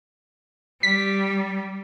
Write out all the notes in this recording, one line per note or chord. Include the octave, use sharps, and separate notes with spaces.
G3 B6